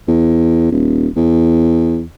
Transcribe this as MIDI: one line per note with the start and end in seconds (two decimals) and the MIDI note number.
0.08 0.69 40
0.72 1.08 27
1.17 2.03 40